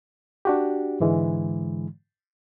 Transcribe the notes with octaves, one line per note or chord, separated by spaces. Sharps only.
D4 F#4 G4
G#2 D3 E3 G#3